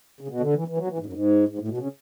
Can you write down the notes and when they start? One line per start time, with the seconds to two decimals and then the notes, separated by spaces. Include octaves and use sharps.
0.21 C#3
0.28 B2
0.40 D3
0.54 E3
0.68 E3
0.78 F#3
0.88 E3
0.98 G#2
1.06 F#2
1.13 G#2
1.49 G#2
1.59 A2
1.68 B2
1.77 C#3